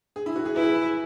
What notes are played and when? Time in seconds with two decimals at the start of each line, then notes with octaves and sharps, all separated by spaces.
0.16 G#4
0.26 E4
0.36 F#4
0.45 G#4
0.56 E4 B4
0.63 G#4
0.71 B4